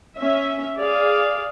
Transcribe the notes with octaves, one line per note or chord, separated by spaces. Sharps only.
C#4 E5
G#4 D5 F5